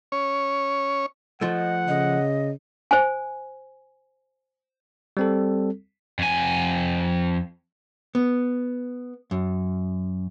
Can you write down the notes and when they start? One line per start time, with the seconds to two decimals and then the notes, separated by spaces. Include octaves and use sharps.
0.12 C#4 C#5
1.41 F3 A3 D#5 F#5
1.88 C#3 D#5
2.91 C5 G#5
5.17 G3 C4 A4
6.19 F2 G#5
8.15 B3
9.31 F#2